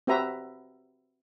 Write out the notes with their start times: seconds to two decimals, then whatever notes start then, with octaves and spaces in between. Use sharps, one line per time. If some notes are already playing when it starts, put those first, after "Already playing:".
0.07 C4 F#4 G4 B4 E5 A#5